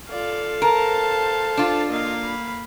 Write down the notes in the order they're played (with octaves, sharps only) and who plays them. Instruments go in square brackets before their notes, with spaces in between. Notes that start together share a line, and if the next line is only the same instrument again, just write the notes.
[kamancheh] F4 D5 [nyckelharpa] A4 F5
[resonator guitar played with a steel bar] A#4 [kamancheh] C5 A5
[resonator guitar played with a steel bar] D4 F4
[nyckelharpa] A#3 F5 [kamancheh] A#4 D#5
[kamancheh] B5